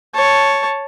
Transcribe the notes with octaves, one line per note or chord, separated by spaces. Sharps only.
C#5 A5